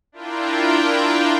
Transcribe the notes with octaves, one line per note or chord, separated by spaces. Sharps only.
D4 E4 F4 A#4 G5